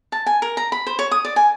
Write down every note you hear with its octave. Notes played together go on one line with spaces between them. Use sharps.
A5
G#5
A#4
A#5
B5
C5
C#5
D#6
D5
G#5